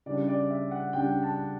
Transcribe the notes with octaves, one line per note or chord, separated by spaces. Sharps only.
C#3 G3 D4 D5
D5
E5
F#5
C#3 G3 D4 G5
A5